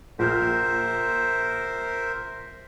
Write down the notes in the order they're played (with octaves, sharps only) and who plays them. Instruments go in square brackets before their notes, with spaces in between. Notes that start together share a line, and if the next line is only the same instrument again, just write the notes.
[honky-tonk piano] A#1 F6 G6 [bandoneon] A#4 C5 E5